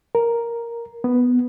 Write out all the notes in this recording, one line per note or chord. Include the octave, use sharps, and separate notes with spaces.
A#4
B3